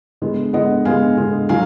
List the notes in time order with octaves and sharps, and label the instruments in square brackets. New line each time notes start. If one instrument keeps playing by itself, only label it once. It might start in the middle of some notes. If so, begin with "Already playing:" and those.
[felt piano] D3 G#3 B3
D3 G#3 B3 D#5 F#5
D3 G#3 B3 F5 G#5
D3 G#3 B3
D3 F#3 F5 G#5